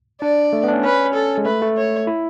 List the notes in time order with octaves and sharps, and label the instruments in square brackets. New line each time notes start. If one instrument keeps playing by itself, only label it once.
[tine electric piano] D4 [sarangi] D5
[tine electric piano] A3
B3
D4
C#4
[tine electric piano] C#4 [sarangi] B4
[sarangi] A4
[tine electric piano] G#3
[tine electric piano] A3 [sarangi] B4
[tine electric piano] A3
[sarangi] C#5
[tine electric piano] E4